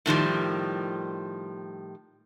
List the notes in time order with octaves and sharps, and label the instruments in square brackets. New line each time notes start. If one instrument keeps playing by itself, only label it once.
[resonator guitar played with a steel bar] A2 D#3 F3 G3